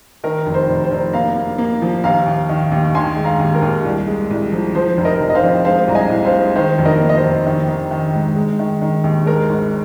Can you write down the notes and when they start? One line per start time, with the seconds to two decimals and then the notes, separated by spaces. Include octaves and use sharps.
0.24 D#3 A#4
0.46 F1
0.54 C5
0.69 F1
0.84 C5
0.91 F1
1.13 A#3 F5 A#5
1.36 A#3
1.58 A#3
1.82 F3
2.04 D#2 F5 A#5
2.26 D#2
2.49 D#3
2.72 D#2
2.95 D#3 G#5 C6
3.16 G#3
3.24 F5 A#5
3.39 D#2
3.55 A#4
3.62 D#2
3.85 C2
4.07 G#3
4.30 C2
4.52 F3
4.75 F3 C5
4.97 F1
5.05 A#4 D#5
5.20 F1
5.30 D#5
5.35 C5 F5
5.43 F2
5.65 G#3 C5 F5
5.88 C2 A#5
5.95 D#5 G#5
6.10 C2
6.25 C5 F5
6.33 G#3
6.55 D#3 C5
6.78 F1
6.85 A#4 D#5
7.00 A#3
7.09 D#5
7.16 C5
7.23 F1
7.46 D#3
7.68 D#3
7.91 D#3
8.14 G#2
8.35 G#3
8.59 D#3
8.82 D#3
9.04 D#2
9.26 G#3 A#4
9.50 G#1